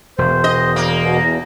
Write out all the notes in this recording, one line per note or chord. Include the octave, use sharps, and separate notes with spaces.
E1 C5
D#5
A#3
B2
E2